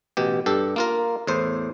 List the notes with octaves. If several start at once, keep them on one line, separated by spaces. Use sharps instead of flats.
A1 B2 G4
G2 G4 A4
A#3 F4 A#4
E2 A2 C5